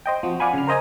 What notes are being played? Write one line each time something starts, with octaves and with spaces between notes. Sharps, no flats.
C5 D#5 G5
F3 C4 F#4
D5 F5 F#5 G#5 B5
C#3 F6
A#4 C5 D#5 G#5 D#6